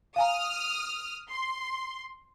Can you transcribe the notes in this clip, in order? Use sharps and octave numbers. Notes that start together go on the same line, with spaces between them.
F5 G#5 A#5 D#6 F6
C6